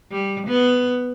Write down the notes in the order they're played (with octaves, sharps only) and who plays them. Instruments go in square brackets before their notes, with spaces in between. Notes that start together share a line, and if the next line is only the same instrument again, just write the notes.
[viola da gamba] G3
B3